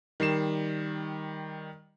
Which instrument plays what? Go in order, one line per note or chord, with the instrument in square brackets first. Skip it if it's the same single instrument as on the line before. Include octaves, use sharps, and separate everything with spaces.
[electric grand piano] D#3 G3 C7 E7